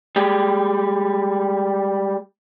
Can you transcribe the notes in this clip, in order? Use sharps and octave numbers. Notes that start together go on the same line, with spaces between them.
G3 G#3 G4